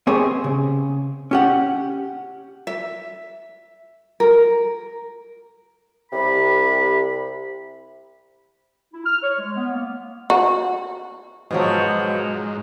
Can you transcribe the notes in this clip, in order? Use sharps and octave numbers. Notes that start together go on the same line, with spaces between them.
B3 C4 G4 G#4 C#5
C#3
C#4 G4 F#5
E5
A#4
C2 C3 B5
E4
F6
C#5
G#3
B3
A#3
F#4
G#2 B2 F3 F#3